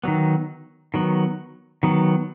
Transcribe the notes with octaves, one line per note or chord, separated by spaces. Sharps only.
D#3 F#3 B3
D#3 F#3 B3
D#3 F#3 B3